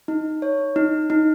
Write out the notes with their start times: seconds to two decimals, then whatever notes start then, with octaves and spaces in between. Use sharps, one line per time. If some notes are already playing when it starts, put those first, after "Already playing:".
0.08 D#4
0.42 C#5
0.76 D#4
1.10 D#4